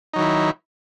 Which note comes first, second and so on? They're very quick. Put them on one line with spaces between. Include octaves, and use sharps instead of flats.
D#4 F#3 D#3 E4